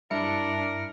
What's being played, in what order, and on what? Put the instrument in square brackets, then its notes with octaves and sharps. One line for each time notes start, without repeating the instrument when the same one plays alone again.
[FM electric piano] G2 E4 C#7 [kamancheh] D4 [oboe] A#4